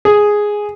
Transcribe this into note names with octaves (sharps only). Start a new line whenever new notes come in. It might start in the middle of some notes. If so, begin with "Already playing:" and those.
G#4